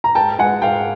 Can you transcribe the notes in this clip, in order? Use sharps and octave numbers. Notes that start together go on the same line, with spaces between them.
A#5
G#2 G5 A5
G#3 F#5 G#5
G#2 F5 G5